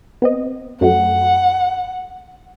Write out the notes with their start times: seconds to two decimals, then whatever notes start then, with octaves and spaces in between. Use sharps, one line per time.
0.22 B3 C4 D#5
0.81 F#2 F#3 A3 F#5